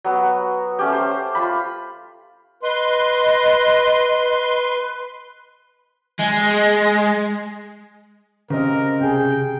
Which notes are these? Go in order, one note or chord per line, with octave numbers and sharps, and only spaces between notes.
F#3 B3
A3 C#4 G4
C5
F4 B5
B4 D#5 C6
G#3
C#3 C4 G4 A#4 D#5
C3 G#4 G5